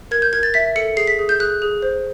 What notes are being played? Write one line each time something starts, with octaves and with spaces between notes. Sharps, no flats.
A#4 G#6
G6
A#4 G#6
A6
E5 B6
A4 C#7
G#4 C7
B6
G#4
G6
G#4 F#6
G#4
C5